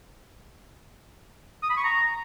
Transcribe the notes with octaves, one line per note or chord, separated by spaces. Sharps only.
D#6
B5
C#6
A#5